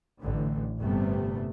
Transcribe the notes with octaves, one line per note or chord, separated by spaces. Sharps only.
A1 D3
G1 C3 G3 A3 B3